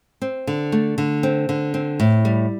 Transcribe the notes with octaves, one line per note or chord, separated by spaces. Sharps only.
C4
D3
A3
D3
C4
D3
C4
A2
G3